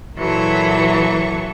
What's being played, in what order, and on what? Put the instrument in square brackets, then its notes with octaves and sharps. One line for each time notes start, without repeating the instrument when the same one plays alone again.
[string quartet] A#2 E3 F#3 A4 C#6